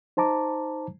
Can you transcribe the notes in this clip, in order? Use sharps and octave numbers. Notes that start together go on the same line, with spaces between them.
D#4 C5 A5 A#5 D6